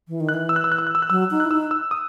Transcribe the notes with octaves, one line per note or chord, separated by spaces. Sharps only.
E3
D#3
F#6
E3
E6
F#6
E6
F#6
E6
F#6
E6
F#6
F#3 E6
D#4
F#6
E4
D#4 E6
E6
D#6